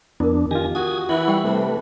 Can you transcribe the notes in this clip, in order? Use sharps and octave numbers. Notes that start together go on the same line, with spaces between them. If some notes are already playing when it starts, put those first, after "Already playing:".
F2 B3 D4 E4 A#4
D#3 F4 G4 G#5 A#6
F#4 D#6 G#6
E3 E4 E5 F#5 B5
G3 G5 C#6
C3 A3 B4